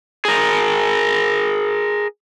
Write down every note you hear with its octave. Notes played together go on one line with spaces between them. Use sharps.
G#4 A#4